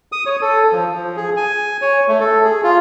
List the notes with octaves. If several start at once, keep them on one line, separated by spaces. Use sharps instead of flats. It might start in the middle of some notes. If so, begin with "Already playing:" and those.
D#6
C#5
A4
F3
F3
G#4
G#5
C#5
A3
A4
G#4
F4